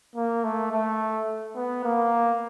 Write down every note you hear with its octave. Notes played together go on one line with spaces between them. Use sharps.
A#3
A3
A3
B3
A#3